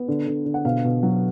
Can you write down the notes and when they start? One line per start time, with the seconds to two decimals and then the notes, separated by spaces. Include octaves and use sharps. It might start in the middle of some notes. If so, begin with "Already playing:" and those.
Already playing: B3
0.08 D3
0.27 D3
0.46 D3
0.54 F#5
0.65 B2 F5
0.84 B2
1.03 F#3